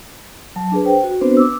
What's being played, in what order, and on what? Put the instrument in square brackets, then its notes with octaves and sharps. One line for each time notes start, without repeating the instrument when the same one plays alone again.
[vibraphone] F#3 A5
D4 G#4 B4
C5 G5
F#4
B3 C4 D4 F#4 B4 C5
D6 E6